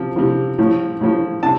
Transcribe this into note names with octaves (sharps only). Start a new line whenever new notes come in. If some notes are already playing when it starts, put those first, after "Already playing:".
Already playing: C3 F3
C3 F3
A2 F3
A2 F3
C3 A5